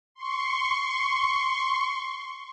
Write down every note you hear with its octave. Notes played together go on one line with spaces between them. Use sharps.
C6 C#6